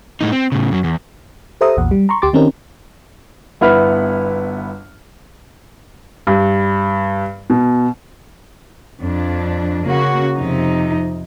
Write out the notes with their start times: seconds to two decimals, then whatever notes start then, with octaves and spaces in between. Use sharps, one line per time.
0.21 A2 D#4
0.32 C4
0.52 A2 C#3
0.72 F#2 F#3
0.84 E2
1.61 G4 A4 C5 E5 A#5 D#6
1.77 A#1 E2 A#2 F#5
1.91 G3
2.09 A#5 C6 C#6
2.22 D2 G4 C6 D6 A6
2.33 D#3 C4 C#4 D#4 G4 A#4
3.61 G1 B3 E4 F#5 B5 F6
6.27 G2
7.50 B2
8.99 F2 D4
9.87 C#3 A#3 F#4
10.36 F2 C3 D#4